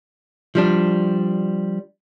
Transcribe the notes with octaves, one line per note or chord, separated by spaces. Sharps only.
F3 G3 D4